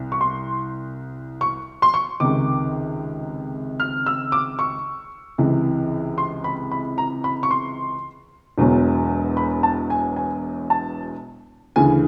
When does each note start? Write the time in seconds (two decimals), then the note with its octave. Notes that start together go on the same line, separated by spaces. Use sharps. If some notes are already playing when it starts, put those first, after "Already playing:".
Already playing: C2
0.12 C#6
0.21 C6
1.41 C#6
1.82 C6
1.94 C#6
2.20 C#2 C3 D#3 D6
3.80 F6
4.06 E6
4.32 D6
4.59 C#6
5.38 C#2 C3 E3
6.18 C6
6.44 B5
6.71 B5
6.98 A#5
7.24 B5
7.43 C#6
7.51 C6
8.58 E1 E2 B2 F#3
9.37 B5
9.63 A5
9.90 G#5
10.16 G#5
10.70 A5
11.76 D2 C#3 E3 G#5